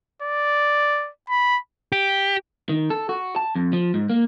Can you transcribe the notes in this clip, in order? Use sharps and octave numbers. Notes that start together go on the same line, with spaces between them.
D5
B5
G4
D#3
A4
F#4
A5
F2
F3
G#2
A#3